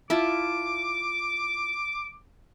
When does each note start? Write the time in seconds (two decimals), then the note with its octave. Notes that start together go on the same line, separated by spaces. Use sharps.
0.10 E4 F4 A5 D6